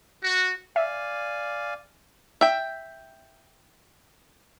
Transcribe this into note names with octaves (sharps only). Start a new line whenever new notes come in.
F#4
D5 E5 F5 G#5
E5 G5